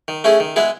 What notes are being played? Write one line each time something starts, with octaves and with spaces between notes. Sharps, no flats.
D#3
A3 C#4 E4 G#4
D#3
G#3 B3 E4 G#4